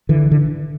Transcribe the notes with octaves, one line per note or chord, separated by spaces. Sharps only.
D3 E3
D3